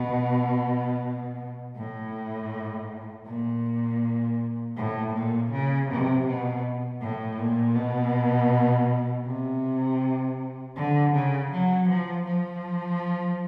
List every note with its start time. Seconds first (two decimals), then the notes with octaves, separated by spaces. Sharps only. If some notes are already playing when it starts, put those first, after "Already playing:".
Already playing: B2
1.76 A2
3.27 A#2
4.76 A2
5.14 A#2
5.51 C#3
5.89 C3
6.27 B2
7.01 A2
7.39 A#2
7.76 B2
9.26 C3
10.76 D3
11.14 C#3
11.51 F#3
11.89 F3
12.25 F3